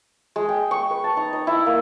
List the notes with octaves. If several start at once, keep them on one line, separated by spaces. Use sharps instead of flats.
G#3
G5
C#6
B4
A5
D#4
D#5
E4
A#3